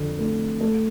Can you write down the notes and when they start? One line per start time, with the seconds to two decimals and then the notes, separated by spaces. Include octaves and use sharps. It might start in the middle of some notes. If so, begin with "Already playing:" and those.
Already playing: F2 D3
0.19 A3
0.61 A3